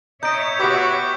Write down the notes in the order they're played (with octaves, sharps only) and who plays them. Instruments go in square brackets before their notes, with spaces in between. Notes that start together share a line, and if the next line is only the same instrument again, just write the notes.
[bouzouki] D#4 [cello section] C#5 E5 [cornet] D#5 [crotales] G6 D7
[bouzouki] B3 G4 [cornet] F#4 [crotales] D6